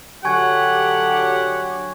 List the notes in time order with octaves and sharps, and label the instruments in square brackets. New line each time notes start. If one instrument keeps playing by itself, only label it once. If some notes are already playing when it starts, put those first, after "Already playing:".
[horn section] D3 G4 [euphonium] F#3 [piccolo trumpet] F#5 [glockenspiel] G#5 C#6 G#6